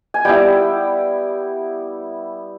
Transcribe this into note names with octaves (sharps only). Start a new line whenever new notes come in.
G#5
G3 B3 E4 G5